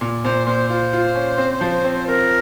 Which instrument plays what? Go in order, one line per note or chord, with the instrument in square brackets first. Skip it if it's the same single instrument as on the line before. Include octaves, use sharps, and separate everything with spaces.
[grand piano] A#2
[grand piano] A#2 [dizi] C5
[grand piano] A#2 [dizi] C5
[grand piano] F4 [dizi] C5
[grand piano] F4
C#4
C4
F3
C4
[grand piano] C4 [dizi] A#4